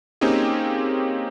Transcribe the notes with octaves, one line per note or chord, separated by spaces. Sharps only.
A#3 C4 C#4 D#4 G4 G#4